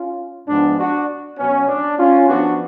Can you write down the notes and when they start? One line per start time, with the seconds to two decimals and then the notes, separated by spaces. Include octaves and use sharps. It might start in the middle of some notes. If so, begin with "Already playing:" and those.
Already playing: C#4 F4
0.48 G#2 F3 G#3 B3 D4
0.78 D4 F#4
1.38 B2 F#3 B3 C#4
1.68 D4
1.98 C#4 F4
2.28 F#2 F3 B3 D4 F#4